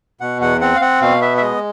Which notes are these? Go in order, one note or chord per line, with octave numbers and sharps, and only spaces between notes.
B2 F#5
E2 F#5
C4 F#5
F5
C4 F#5
B2 F5
B3 E5
E5
G#3 D#5